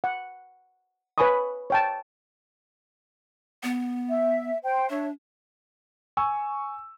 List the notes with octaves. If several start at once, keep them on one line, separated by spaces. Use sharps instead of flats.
F#5
B4 C#5 G#5 B5 C#6 D#6
C#5 G5 A5
B3
E5
C5 G5
D4 C#5 E5
G#5 C#6 E6